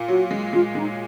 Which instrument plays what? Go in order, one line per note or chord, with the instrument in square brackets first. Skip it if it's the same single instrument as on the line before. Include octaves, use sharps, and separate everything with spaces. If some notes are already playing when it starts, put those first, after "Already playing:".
Already playing: [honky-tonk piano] A#2
[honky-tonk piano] F#3 [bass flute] F#4
[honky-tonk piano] G#3
[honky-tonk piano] G#3 [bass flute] F4
[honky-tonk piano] G#3 [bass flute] D#4